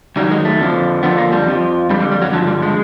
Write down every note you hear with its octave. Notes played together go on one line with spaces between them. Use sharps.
F#2 D#3 F#3 G3
G#3
A3
F2 D3 F3
F2 D3 F3 B3
A#3
G3
F2 D3 F3
F2 D3 G3
G3
G3
F#3
G2 D3 F3 F#3
G3
G#3